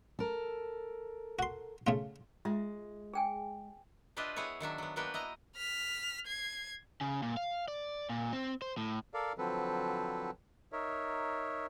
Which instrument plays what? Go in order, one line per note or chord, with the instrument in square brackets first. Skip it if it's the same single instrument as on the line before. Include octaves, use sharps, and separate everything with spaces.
[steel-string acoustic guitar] A4 A#4
[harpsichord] F#4 C6
C#3 A3 F4
[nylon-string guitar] G#3 [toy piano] F4 E5
[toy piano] G#4 G5 G#5
[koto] D4 F4 G4 B4 D#5 E5
B3 E4 G#4 C#5
D#3 F#3 D4 E5
F#3 B3
A#3 B3 D4 F#4 B4 G5
E4 D#5 A#5
[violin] F6 B6
G#6 C7
[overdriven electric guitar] C#3
A#2
F5
D5
A#2
C4
C5
A2
[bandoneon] A4 A#4 D5 F5
D3 F3 F#3 C4 A4 B4
D#4 A#4 C#5 E5